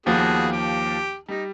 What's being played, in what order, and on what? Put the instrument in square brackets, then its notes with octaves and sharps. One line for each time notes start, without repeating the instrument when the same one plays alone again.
[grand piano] D#2 F3 [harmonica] B3 F#4 G#4
[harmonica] G4
[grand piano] G3 [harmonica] D#4